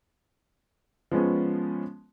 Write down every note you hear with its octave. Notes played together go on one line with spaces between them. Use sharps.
F3 G#3 B3 C#4